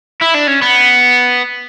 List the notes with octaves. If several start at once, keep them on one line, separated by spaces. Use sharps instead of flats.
E4
D4
C#4
B3